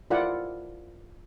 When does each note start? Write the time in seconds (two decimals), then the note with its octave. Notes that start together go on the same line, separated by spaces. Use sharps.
0.10 E4 F4 A#4 D5 F#5